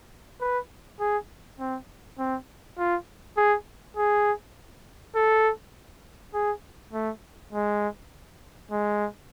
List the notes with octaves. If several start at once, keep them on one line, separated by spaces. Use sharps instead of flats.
B4
G#4
C4
C4
F4
G#4
G#4
A4
G#4
A3
G#3
G#3